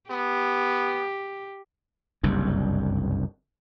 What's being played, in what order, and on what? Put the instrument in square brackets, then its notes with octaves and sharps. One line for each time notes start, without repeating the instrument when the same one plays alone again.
[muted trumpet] B3 [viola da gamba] G4
[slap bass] F#1 C2 G2